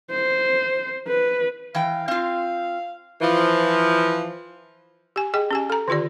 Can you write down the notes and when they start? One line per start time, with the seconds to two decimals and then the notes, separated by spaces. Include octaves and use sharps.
0.11 C5
1.08 B4
1.75 E3 F5 G5
2.08 C4 F4 F5
3.22 E3 F3
5.16 G4 G#5
5.34 G#4 D#5 G5
5.51 C#4 G4 G#5
5.70 A4 A#5
5.88 D3 D#3 F4 G4 D5